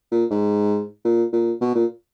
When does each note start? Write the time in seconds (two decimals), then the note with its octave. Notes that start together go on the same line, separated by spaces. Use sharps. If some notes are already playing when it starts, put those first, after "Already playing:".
0.12 A#2
0.30 G#2
1.05 A#2
1.33 A#2
1.61 B2
1.75 A#2